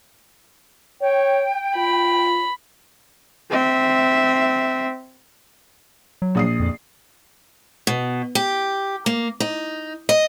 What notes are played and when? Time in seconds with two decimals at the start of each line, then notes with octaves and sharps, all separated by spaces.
1.02 C#5 G5
1.76 F4 B5
3.51 C4 E5
6.22 F#3
6.35 A#1 D#6 C7
6.60 F2
7.87 B2
8.35 G4
9.06 A#3
9.40 D#4
10.09 D#5